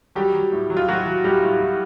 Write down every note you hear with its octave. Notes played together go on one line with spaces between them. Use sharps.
F#3 G3 G4
F#3
A2
F#3
F4
A2 F#3 F#4
F#3
A2 G3 G4
A2
A2